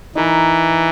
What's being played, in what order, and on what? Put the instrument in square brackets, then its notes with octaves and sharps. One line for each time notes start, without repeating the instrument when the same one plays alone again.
[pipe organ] E3 [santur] D#4 A#4 B4